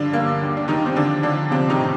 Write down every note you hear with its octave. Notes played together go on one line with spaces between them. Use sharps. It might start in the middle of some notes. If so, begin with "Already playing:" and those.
Already playing: G2 D3 F3 D4
G2 A#3
D#2
D4
D#3 G3 D#4
C4
D3 F3 D4
D3 F3 D4
C3 F3 C4
D#3 D#4
A2